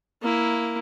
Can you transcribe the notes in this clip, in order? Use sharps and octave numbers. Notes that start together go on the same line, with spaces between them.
A#3 E4